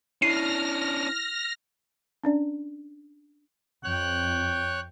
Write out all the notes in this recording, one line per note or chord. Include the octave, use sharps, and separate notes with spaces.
C#4 D4 E4 F6 A#6 C7 D#7
C#4 D4 D5
F2 C#5 G5 F#6